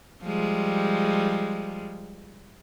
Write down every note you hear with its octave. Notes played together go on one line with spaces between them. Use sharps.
F3 G3 G#3